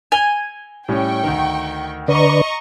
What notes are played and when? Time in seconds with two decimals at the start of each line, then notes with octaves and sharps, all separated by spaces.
0.12 G#5 F7 G7
0.88 A2 G3 C#4 G5 C#6
1.24 D2 D#3
2.08 D3 B4 D5 D#5 A#5 C#6